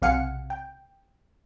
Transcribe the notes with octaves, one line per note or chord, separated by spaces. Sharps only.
B1 C3 F5 F#5 G#5 C#7
G5